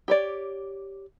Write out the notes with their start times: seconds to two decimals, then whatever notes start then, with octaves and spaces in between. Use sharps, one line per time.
0.08 G4 C#5 D5